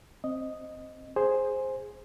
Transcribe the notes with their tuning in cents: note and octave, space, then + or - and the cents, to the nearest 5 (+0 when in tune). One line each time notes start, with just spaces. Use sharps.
C4 +0 D#5 +0
G#4 +0 C5 +5